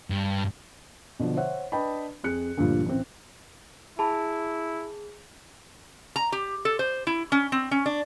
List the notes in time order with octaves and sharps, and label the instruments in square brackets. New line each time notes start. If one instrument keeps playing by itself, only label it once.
[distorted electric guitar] G2
[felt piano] B2 D3 F3
C5 C#5 E5 F#5
D4 B4 D#5 G5 A5 B5
F2 G#4 F#6 C#7
D2 G2 A#2 F3 F4
A1 C4
[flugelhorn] E4 [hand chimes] G#4 [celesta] A5 B5
[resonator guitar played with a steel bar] A#5
G4
A4
C5
E4
C#4
C4
C#4
D4